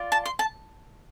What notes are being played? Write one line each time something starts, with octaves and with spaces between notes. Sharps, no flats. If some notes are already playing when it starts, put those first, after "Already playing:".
Already playing: F4 D5
A5
C6
A5